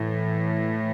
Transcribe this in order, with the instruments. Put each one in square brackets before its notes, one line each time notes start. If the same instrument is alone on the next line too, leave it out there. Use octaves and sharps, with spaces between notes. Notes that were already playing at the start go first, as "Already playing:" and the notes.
Already playing: [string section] A2 E3